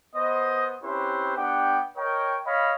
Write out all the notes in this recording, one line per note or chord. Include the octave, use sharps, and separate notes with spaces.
B3 C5 D#5
C4 C#4 E4 G4 B4 C5
B3 D4 G4 F#5 G5
A#4 C#5 D#5 G5
C#5 D#5 F5 B5